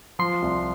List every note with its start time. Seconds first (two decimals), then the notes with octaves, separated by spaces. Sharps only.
0.19 F3 C6
0.42 C2